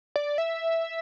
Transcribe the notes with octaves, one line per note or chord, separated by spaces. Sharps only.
D5
E5